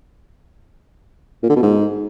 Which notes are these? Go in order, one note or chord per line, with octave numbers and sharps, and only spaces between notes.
A#2
D3
B2
G#2